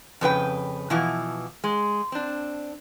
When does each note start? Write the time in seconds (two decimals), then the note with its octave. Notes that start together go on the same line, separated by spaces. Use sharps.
0.21 F2 C#3 B4 G5
0.90 B2 E3 F3 E4
1.64 G#3
2.12 C4 D4